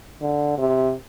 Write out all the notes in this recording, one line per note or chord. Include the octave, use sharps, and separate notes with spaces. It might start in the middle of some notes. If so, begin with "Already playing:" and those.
D3
C3